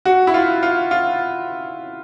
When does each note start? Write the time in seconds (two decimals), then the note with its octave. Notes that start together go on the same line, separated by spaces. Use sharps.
0.05 F#4
0.27 E4
0.34 F4
0.63 F4
0.91 F4